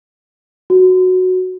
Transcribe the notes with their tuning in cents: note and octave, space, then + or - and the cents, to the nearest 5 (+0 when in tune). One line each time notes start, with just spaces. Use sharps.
F#4 -5